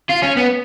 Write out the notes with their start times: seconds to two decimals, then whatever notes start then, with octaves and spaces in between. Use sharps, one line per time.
0.10 F4
0.23 C#4
0.37 B3